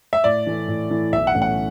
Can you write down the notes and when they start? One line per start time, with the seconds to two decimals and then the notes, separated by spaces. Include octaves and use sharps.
0.13 E5
0.24 A2 D5
0.47 E3 A3 E4
0.68 A2
0.90 E3 A3 E4
1.12 B1 E5
1.27 F#5
1.35 A2 E3 A3 C#4
1.42 F#5